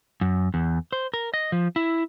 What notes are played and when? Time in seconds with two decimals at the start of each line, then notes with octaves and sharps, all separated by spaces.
0.21 F#2
0.54 E2
0.92 C5
1.14 A#4
1.34 D#5
1.52 F3
1.76 E4